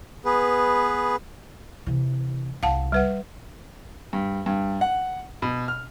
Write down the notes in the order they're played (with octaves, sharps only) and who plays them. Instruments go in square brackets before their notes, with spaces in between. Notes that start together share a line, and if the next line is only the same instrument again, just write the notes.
[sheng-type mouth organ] B3 G#4 B4
[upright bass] C3 E3
[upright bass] C2 [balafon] F5 F#5 A5
[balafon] G3 B4 F#5
[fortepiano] G2
G2
F#5
B2
F6